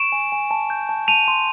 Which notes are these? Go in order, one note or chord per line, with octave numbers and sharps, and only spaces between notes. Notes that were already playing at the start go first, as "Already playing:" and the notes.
Already playing: C#6 D7 E7
G#5
G#5
A5
G6
A5
A5 D#7 F7
C6